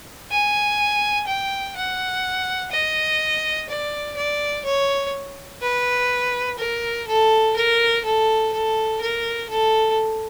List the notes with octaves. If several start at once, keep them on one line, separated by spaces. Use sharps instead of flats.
G#5
G5
F#5
D#5
D5
D5
C#5
B4
A#4
A4
A#4
A4
A4
A#4
A4